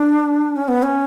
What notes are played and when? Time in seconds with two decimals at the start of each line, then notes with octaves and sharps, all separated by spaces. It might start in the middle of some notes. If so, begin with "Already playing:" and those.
Already playing: D4
0.56 C#4
0.68 B3
0.83 C#4